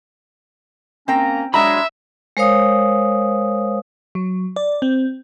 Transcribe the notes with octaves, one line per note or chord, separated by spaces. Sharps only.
A#3 C4 C#4 G5 A#5
F#3 G#3 D4 E5 A#5 B5
G#3 A#4 C5 C#5 F5 D#6
F#3
D5
C4